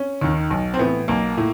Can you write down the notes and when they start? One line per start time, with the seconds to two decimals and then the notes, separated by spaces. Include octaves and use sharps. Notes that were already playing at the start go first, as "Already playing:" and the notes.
Already playing: C#4
0.21 D#2 D#3
0.50 B1
0.74 C4
0.79 A2 E3 B3
1.08 B1 A#3
1.37 A2